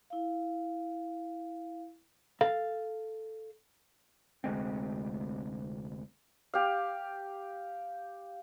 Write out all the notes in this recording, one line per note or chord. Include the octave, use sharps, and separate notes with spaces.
E4 F5
A4 F5
F1 D2 G#3 C4
G4 F5